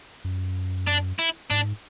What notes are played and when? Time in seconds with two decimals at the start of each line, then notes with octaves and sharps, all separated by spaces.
0.24 F#2
0.87 D4
1.19 E4
1.50 G#2 D4